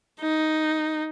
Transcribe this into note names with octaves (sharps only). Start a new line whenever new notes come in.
D#4